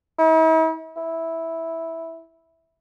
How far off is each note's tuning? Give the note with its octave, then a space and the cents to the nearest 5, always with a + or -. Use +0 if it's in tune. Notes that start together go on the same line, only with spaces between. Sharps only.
E4 -45
E4 -10